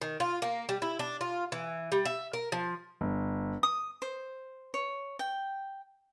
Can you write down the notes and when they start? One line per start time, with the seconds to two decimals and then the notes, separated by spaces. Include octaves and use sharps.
0.02 D#3
0.20 F4
0.42 A#3
0.69 G3
0.82 E4
0.99 D4
1.21 F4
1.52 E3
1.92 G3
2.05 E5
2.33 A#4
2.52 F3
3.01 G1
3.63 D#6
4.02 C5
4.74 C#5
5.19 G5